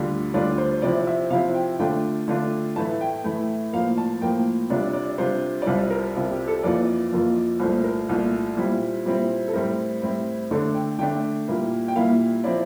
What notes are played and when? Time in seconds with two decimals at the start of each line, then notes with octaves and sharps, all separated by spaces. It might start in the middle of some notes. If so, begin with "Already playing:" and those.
Already playing: D2 D3 G3 D4 F4
0.34 D2 D3 G3 D4 F4 D5
0.58 C5
0.82 C3 F3 C4 E4 D5
1.07 E5
1.30 C3 F3 C4 E4 F5
1.55 G5
1.79 D3 A3 D4 F4 G5
2.28 D3 A3 D4 F4
2.76 A2 E3 A3 E4 A5
3.01 G5
3.24 A2 E3 A3 E4
3.73 A2 F3 A#3 F5
3.98 A5
4.22 A2 F3 A#3 G5
4.70 C3 G3 D4 F4 D5
4.93 D5
5.18 C3 G3 D4 F4 C5
5.62 D5
5.66 C2 C3 G3 C4 F4 C5
5.90 A#4
6.15 C2 C3 G3 C4 F4
6.31 G4
6.48 A4
6.63 F2 E3 A#3 F4 D5
7.12 F2 E3 A#3 F4
7.60 C2 A#2 A3 C5
7.84 A#4
8.09 C2 A#2 A3
8.57 A#2 G3 C4 E4
9.06 A#2 G3 C4 E4
9.48 A4
9.53 A2 G3 C4 E4 A#4
10.02 A2 G3 C4 E4
10.51 D3 A3 D4 A4
10.74 G5
10.98 D3 A3 D4 G5
11.48 A#2 G3 A#3 E4
11.88 G5
11.96 A#2 G3 A#3 E4 F5
12.44 F3 C4 E4 D5